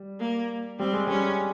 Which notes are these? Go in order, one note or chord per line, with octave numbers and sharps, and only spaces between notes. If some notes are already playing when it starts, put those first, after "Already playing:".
Already playing: G3
A#3
G3 C4
G#3
G3 C#4